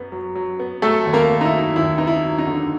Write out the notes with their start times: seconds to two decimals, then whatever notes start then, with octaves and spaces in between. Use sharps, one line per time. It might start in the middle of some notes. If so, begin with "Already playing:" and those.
Already playing: F#2 B3
0.12 F#3
0.35 F#3
0.59 B3
0.82 F#3 A3 A4
1.06 D#2
1.13 A#3 A#4
1.30 D#2
1.41 D#4
1.45 E4
1.53 F#3
1.76 D#2 E4
1.98 B3 D#4
2.07 E4
2.23 F#3
2.38 D#4
2.47 D3